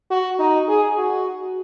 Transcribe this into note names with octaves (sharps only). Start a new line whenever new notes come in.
F#4
D#4
G#4
F#4